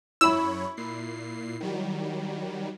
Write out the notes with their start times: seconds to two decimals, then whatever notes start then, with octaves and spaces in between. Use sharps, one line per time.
0.21 F#2 E4 C#5 B5 E6
0.77 A#2 C7
1.61 D#3 F#3 G3